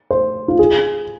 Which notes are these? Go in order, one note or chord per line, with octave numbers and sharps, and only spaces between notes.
C5
F4
G#4